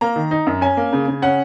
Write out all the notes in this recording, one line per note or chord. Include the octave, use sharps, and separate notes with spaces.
A#3 A#5
D#3
D#4
F#2
C#4 G#5
A#3
C#3
C#3
C#4 F#5